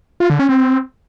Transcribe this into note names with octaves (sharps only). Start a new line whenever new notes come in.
F4
D3
C#4
C4